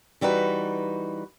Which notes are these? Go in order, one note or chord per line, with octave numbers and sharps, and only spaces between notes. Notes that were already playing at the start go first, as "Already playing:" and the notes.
E3 G3 D#4 F#4 B4